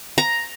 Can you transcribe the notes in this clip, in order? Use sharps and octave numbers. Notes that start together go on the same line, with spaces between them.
A#5